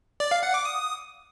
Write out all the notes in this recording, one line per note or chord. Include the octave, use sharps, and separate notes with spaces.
D5
F5
F#5
D6
D#6